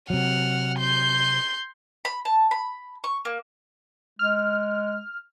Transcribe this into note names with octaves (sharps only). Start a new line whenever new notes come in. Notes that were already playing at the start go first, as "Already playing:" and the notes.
C3 F#3 F#5 F6
C6 G6
B5
A5
B5
C#6
A#3
G#3 F6